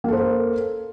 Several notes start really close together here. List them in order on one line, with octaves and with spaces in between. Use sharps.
A#3 A4 C5 A#4